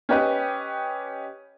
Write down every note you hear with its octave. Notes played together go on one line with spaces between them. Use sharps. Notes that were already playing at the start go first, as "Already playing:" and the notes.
C#4 G4 B4 D#5